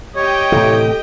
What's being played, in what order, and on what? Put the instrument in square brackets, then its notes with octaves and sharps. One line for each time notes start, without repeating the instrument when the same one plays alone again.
[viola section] G4 D#5 G5 [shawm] C#5
[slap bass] A2 C3 E3 [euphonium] A4